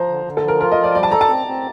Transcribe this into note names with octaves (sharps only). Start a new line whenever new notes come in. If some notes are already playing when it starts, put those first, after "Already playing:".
Already playing: F3 C5 A#5
D3
D3
A4
F3
A#4
F4 A#4
D#5
F3
D5
G3 D5
A5
A4 A#5
A5
C4
C4